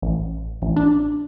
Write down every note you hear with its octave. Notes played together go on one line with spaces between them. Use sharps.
A1
A1
D4